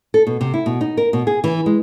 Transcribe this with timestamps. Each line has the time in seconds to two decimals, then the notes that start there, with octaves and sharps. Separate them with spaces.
0.14 A4
0.27 B2
0.41 C3
0.54 E4
0.66 B2
0.81 D#4
0.97 A#4
1.13 B2
1.27 G#4
1.44 E3
1.66 G#3